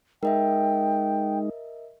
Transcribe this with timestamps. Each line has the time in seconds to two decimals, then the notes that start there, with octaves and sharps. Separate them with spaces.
0.23 G#3 D#4 A#4 D#5 E5 G5